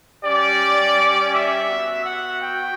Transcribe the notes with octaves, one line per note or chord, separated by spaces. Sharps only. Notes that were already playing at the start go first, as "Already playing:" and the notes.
G3 C#4 G4 D5
E5
B3 F#4
F#5
G5